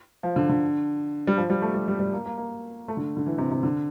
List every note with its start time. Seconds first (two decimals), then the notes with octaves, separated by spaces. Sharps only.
0.23 F3
0.36 D3
0.49 D3
1.27 G3
1.37 F3
1.50 G3
1.62 A3
1.74 G3
1.88 G3
1.99 G3
2.13 A#3
2.26 A#3
2.38 A#3
2.88 A3
2.97 D3
3.17 D3
3.26 E3
3.38 C3
3.51 C3
3.63 D3